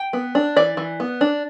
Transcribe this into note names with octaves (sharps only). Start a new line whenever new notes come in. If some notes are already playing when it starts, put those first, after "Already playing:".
Already playing: G5
B3
D4
E3 D5
E3
B3
D4